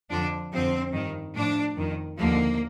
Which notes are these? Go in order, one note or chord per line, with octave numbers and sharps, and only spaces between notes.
F2 D3 F3 D4
F2 D3 F3 C4
G2 D#3
A2 F3 D4
F2 D#3
D#2 D3 F3 A#3